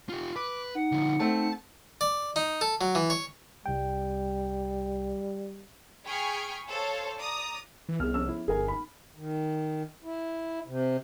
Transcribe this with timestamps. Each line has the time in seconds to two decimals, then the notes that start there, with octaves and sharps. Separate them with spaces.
0.09 F4 G4
0.36 B4 D6
0.75 D#4 F#5
0.92 D3 F3
1.20 A3 C4 A5
2.01 D5
2.36 D#4
2.61 A4
2.81 F#3
2.95 E3
3.10 C#5
3.66 C2 G3 G5
6.07 G#4 G5 B5 C#6 F6 G#6
6.69 A4 C5 C#5 F5 A5
7.19 D5 A#5 D#6
7.89 E3
8.00 C2 B3 G#4 F6
8.14 F3 C#4 E6
8.29 E4
8.48 G1 G#4 A#4 G#5
8.68 D#4 B5
9.16 D#3
10.04 E4
10.67 C3